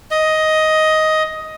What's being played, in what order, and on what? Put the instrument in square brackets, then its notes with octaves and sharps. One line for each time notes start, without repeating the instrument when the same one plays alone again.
[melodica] D#5